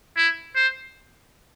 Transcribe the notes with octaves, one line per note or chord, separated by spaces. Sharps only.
E4
C5